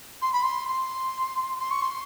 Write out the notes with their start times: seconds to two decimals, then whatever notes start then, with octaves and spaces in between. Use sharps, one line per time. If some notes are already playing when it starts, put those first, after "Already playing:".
0.22 C6
0.33 B5
0.43 C6
0.68 C6
1.59 C6
1.71 C#6
1.82 C6